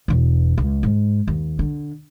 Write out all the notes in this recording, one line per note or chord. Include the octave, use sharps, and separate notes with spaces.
E1 E2
C#2
G#2
D#2
D3